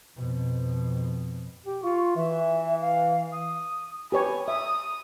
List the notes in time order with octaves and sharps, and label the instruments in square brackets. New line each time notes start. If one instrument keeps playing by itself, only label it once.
[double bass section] F2 B2
[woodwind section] G4
[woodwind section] F4 [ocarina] C#6
[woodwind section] E3 [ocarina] E5
[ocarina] F5
D#6
[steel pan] G4 B4 C#5 [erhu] G#5
[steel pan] E5 [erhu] D#6